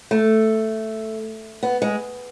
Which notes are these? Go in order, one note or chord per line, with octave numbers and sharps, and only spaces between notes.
A3
B3
G#3